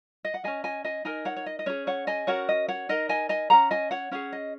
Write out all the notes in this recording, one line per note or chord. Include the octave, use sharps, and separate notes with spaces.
D#5
F#5
C#4 G#4 D#5 G#5
D#5 G#5
D#5 G#5
D#4 A#4 D#5 G#5
C#5 F#5
C#5
D#5
D#5
C#4 G#4 C#5
C#5 F#5
D#5 G#5
C#4 F#4 A#4 C#5 F#5
D#5
C#5 F#5
D#4 A#4 D#5
D#5 G#5
D#5 G#5
C#4 G#4 F#5 A#5
D#5 G#5
C#5 F#5
C#4 G#4 C#5 F#5
D#5